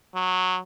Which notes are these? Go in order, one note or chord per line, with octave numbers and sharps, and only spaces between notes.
F#3